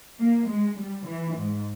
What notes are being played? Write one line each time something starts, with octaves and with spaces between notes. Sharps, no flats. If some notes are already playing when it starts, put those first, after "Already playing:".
A#3
G#3
G3
E3
G#2